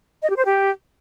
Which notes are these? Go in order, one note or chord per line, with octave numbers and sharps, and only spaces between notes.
D#5
G4
C5
G4